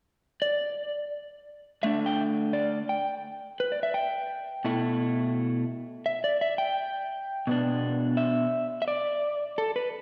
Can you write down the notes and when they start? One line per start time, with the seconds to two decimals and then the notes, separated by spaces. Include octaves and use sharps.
0.42 D5
1.83 D3 A3 D4 E5
2.06 G5
2.53 D5
2.89 G5
3.60 B4
3.72 D5
3.83 E5
3.94 G5
4.65 B2 A3 E4
6.06 E5
6.24 D5
6.41 E5
6.58 G5
7.47 B2 B3 D4
8.17 E5
8.82 E5
8.88 D5
9.58 A4
9.76 B4